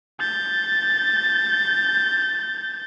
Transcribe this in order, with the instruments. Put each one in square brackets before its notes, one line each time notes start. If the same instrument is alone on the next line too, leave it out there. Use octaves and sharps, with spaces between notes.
[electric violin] G6 A6